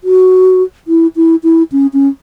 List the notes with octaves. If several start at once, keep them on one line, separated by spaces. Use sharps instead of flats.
F#4
E4
E4
E4
C#4
C#4